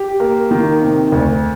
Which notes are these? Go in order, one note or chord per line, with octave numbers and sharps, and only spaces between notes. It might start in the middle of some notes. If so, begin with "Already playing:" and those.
Already playing: G4
A#3
D#3
C3
D2